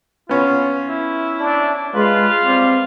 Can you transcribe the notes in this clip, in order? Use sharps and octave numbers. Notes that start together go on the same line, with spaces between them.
B3 C#4 F4
E4
D4
G#3 F4 B4
G3 C4